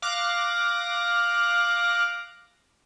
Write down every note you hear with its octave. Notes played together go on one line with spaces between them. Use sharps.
F5 D6 F#6 A#6